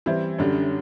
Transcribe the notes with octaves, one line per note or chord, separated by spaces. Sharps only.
E3 G3 C4 E4
F#2 D3 G3